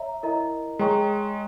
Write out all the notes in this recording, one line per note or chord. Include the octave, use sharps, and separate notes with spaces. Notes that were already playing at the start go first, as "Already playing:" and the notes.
Already playing: C#5 E5 A#5
E4 A#4 D#5 A#5
G#3 C#5 G5 A#5 C#6